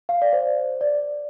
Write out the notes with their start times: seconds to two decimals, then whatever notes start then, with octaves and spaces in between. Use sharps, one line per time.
0.09 F5
0.22 D5
0.33 C5
0.81 D5